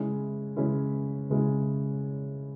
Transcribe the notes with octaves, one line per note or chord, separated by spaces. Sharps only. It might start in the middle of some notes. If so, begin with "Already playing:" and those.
Already playing: C#3 G#3 C#4 E4
C#3 G#3 C#4 E4
C#3 G#3 C#4 E4